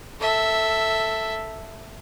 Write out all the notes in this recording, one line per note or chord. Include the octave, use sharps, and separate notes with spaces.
A4 E5